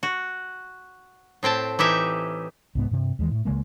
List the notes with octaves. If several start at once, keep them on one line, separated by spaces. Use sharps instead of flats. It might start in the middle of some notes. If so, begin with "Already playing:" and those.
F#4
A2 C4 G5 A5
E3 D#4 G4 E5
C2 G#2 B3
G2 C3
D#2 E3 G#3
A2
C#2 C#3 G#3 A#3